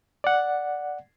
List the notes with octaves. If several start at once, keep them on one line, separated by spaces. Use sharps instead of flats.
D5 F#5